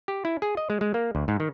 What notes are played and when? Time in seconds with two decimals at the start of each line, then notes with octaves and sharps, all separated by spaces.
0.08 G4
0.25 E4
0.42 G#4
0.57 D#5
0.70 G#3
0.81 G#3
0.94 A#3
1.15 D2
1.28 G#2
1.40 D#3